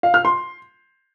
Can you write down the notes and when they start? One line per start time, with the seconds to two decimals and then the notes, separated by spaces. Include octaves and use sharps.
0.03 F5
0.14 F6
0.25 C6